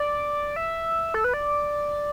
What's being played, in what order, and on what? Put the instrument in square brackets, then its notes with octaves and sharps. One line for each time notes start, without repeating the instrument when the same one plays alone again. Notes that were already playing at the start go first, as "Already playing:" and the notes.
Already playing: [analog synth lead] D5
E5
A4
B4
D5